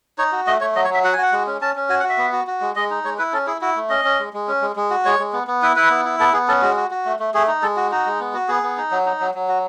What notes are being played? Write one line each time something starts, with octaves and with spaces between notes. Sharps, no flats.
D#4 C#5
F#4
A3 D#5
A3 C#5
F#3 D#5
C#5
F#3 E5
F#4 F#5
G#5
F#4 F#5
G#3
C#4
C#4 A5
C#4
F#4 G#5
F#5
F#4
E5
B3
F#4
F#4
G#3
G#3 D#5
D#4
G#3 C#5
E4 B4
C#4 A4
E4 G#4
E4 F#4
A3
C#4 D#5
C#4
G#3
G#3
C#4
G#3
G#3
F#4
G#3 C#5
G#3
B3
B3
E4 B4
E4 B4
B3
E4
B3 A4
B3 G#4
C#4 A4
G#3 F#4
F#4
F#4
A3
A3
A3 G#4
D#4
G#3 A4
F#4
D#4 F#4
G#3
B3
F#4
B3 G#4
B3
D#4
F#3
D#4
F#3
F#3
F#4